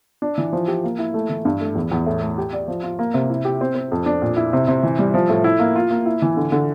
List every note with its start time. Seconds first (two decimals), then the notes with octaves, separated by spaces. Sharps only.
0.22 D4
0.38 E3
0.53 F3
0.68 G4
0.84 A#3
0.99 E4
1.14 A3
1.30 E3
1.45 G2
1.61 A3
1.75 E2
1.91 E2
2.06 A2
2.22 A3
2.38 G4
2.53 D5
2.68 F3
2.84 F4
2.99 A#3
3.14 C3
3.30 E4
3.45 G4
3.61 C4
3.75 C4
3.92 F2
4.06 D4
4.22 A#2
4.37 E4
4.53 C3
4.68 C3
4.83 E3
4.99 G3
5.14 F3
5.29 A2
5.44 E4
5.60 A#3
5.76 F4
5.91 A#3
6.06 E4
6.22 E3
6.37 D3
6.52 D3